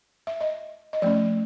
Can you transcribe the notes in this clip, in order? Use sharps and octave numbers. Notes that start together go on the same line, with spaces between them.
E5
D#5
D#5
F3 A3 C#4 D5